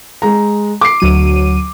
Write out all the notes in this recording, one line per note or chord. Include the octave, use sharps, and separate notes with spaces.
G#3 A#5
D6 C7
D2 F#3 D#7